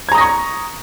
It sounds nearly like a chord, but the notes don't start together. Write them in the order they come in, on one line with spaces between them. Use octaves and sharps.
G#6 A#5 D#6 A#6 C#6